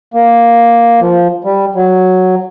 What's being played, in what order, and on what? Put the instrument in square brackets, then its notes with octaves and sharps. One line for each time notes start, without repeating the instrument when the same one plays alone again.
[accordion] A#3
F3
G3
F#3